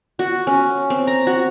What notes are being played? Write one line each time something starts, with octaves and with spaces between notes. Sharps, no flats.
F#4
C#4
C4
A#5
F#4